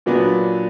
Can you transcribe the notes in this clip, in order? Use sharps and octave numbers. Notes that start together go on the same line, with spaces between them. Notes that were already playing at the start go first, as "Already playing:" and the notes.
A#2 F#3 B3 D4